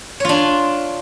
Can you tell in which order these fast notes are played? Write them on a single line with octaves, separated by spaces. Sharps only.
C#5 F4 D4